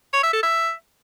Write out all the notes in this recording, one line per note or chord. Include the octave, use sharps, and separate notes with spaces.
C#5
E5
A4
E5